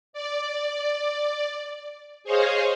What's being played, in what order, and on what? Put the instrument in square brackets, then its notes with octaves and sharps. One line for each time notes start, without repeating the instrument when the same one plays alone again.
[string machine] D5
G#4 C5 C#5 D#5 F5